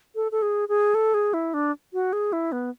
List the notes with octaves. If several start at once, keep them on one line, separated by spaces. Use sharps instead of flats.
A4
A4
G#4
G#4
A4
G#4
E4
D4
F#4
G#4
E4
B3